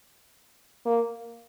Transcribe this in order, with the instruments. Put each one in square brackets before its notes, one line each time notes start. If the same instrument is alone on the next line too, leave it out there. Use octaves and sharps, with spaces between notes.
[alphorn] A#3